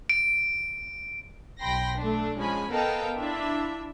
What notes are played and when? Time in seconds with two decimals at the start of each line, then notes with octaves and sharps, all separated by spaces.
0.10 D7
1.60 B1 G5 B5 C6 A#6
1.99 A3 D4
2.37 F3 G#3 C#4 G#5 B5
2.70 B3 A4 A#4 D#5 F5 G5
3.17 D4 E4 F4 E5